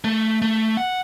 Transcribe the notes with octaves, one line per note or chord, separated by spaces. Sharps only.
A3
A3
F#5